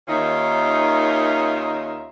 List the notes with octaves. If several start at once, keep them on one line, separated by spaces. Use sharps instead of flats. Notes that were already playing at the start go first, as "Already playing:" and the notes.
D#2 D#3 C#4 D#4 F4 E5